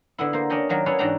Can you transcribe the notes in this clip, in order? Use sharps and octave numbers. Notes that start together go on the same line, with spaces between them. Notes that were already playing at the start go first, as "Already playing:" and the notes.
D3 B3 E4
A#3 C5
C#4 D4 C#5 D#5 G5
D#3 F#3 A#3 D#4
C#4 D4 E4 G#4 B4 C#5
G#2 E3 D4 F#4 G5 A#5